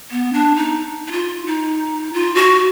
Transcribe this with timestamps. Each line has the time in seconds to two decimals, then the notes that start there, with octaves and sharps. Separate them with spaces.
0.11 B3
0.33 D4
0.56 D#4
1.07 D#4
1.12 F4
1.46 D#4
2.13 F4
2.35 F#4